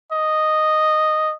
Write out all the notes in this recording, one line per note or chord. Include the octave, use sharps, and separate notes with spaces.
D#5